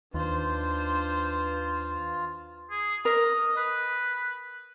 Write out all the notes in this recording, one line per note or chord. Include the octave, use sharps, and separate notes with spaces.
D#2 D4 F4 B4 C5
G#4
A#4 D#5
B4